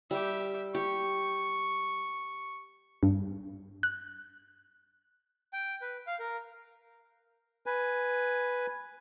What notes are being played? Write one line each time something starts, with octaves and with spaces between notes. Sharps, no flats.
G3 G4 E5
G4 C#6
G2
F#6
G5
B4
F5
A#4
B4 G#5